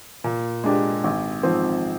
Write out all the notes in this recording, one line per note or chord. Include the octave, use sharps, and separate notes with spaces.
A#2
G#3 D4 G4
G#1
G#2 F3 C4